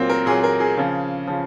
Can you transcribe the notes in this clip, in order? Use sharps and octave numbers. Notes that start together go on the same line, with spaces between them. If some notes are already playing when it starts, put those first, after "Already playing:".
Already playing: A#2 F#3 A#3 C4
A#4
A#2 F#3 G#4
A#4
G#4
C#3 F3
C#3 F3